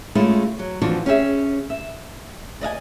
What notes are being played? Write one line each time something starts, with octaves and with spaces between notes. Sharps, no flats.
G#3 A3 C#4 E4 F4
F#3
E3 F3 G3 D4 F4 F#4
C#4 G4 G#4 E5
E5
D5 D#5 F5 G#5